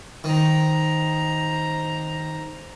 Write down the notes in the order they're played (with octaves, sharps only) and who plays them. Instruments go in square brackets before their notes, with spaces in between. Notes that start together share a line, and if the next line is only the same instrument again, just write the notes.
[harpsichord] D#3 [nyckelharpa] C5 A#5